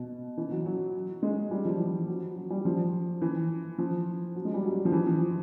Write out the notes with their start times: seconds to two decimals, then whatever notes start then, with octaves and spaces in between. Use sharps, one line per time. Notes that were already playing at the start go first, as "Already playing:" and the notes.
Already playing: B2
0.37 E3
0.51 F#3
0.66 F#3
1.23 G#3
1.51 G3
1.65 F3
1.79 E3
2.08 F#3
2.36 F#3
2.50 G3
2.65 F3
3.21 E3
3.78 F3
4.35 F#3
4.45 G#3
4.54 G3
4.63 F#3
4.85 F3
4.92 E3
5.07 F3